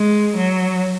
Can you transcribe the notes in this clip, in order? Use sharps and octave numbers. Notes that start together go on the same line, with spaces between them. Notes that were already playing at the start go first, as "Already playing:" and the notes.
Already playing: G#3
F#3